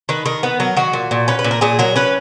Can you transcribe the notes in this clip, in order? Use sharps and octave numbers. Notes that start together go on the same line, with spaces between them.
D#3 B4
D#3 A#4
B3 B4
F#3 A#4
D#3 F#4
A#2
A#2
C#4 B4
B4
A#2
A#4
A#2 G#4
F#3 A#4
C#4 B4